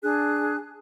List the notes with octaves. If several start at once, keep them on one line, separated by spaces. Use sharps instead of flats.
D4 G#4 F#6